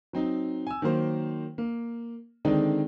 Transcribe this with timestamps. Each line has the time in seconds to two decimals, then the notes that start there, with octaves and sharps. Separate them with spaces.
0.13 F#3 C4 D#4
0.67 G#5 E6
0.82 D#3 F#3 A#3 C5
1.58 A#3
2.45 D3 D#3 G#3 C4 D4 D#4